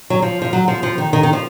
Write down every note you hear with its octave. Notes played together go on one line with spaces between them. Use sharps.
F#3
F3
F3
F#3
F3
F3
D#3
D#3
D#3
F3